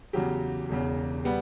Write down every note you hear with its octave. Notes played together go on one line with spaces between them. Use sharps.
E2 C#3 F#3 G4
E1 E2 C#3
G3 B3